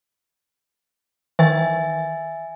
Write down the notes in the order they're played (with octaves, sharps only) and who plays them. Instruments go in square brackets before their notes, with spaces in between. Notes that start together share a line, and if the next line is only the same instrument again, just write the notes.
[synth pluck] D#3 E3 [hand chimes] E5 G#5 A6